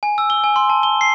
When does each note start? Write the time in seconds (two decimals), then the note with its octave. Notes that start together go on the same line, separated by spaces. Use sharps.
0.03 G#5
0.18 E6
0.30 G7
0.44 G#5
0.56 C6
0.69 A5
0.83 G7
1.01 C7